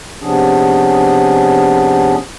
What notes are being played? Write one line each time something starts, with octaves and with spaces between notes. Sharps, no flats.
C3 F3 B3 C#4 D4 G#4